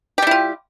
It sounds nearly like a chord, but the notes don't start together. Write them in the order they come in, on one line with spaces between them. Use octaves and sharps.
G4 G3 E4 F4